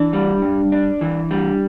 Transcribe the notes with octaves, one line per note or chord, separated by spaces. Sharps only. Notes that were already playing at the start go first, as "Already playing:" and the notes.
Already playing: E3 D4
G3
G2
D4
E3
G3